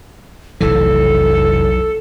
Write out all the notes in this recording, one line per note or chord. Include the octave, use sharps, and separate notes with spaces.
F1 B1 E3 A4